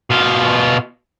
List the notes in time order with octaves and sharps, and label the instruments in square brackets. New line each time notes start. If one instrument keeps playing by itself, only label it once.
[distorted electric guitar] B2 F4